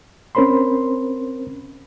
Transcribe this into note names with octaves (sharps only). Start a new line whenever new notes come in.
C4 C#4 A#4 C5 B5 C6